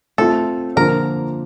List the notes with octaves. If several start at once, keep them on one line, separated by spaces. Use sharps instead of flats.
A3 C4 F4 A4
D3 F3 A#3 F4 A#4 C5